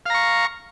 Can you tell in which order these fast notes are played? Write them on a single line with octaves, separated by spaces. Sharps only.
F5 A#5 C#6